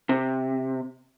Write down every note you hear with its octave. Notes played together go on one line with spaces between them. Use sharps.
C3